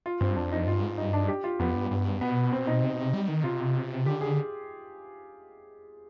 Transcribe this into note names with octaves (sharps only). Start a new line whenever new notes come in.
F4
G2 C4
F2 D4
D#4
G2 F4
G#2
G2 D#4
D4
G4
F4
F2 B3
G2
G2
B2 B3
C4
D#4
C3
B2
C3
G3
D#3
C3 F4
D3 G4
G#4